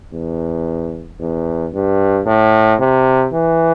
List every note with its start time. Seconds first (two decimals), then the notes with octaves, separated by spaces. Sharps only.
0.13 E2
1.20 E2
1.73 G2
2.26 A2
2.79 C3
3.33 E3